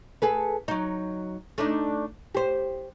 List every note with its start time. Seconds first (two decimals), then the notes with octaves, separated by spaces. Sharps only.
0.22 G#4 A4 B4
0.68 F#3 D#4
1.58 A3 D4 D#4
2.35 G4 C5